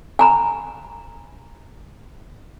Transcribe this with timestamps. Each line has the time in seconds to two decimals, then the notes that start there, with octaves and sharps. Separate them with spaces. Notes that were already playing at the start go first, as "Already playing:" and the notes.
0.19 G#5 A#5 B5